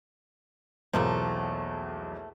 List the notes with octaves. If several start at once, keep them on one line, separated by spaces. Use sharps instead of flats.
B1 E2 F3 A3 A#3